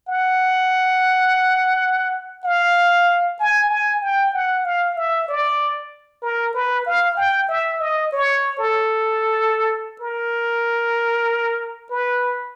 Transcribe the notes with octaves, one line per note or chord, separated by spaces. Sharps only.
F#5
F5
G#5
G#5
G5
F#5
F5
E5
D5
A#4
B4
F5
G5
E5
D#5
C#5
A4
A#4
B4